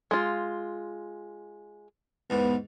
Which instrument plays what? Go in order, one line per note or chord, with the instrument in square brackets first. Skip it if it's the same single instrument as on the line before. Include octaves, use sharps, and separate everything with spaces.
[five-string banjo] G#3 F4
[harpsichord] E2 G#2 [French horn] B3